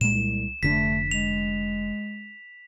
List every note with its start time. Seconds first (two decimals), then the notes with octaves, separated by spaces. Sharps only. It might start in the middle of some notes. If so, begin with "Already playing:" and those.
0.01 C2 A#2 G#3 E7
0.63 F1 D3 A3 D4 B6
1.11 G#3 F7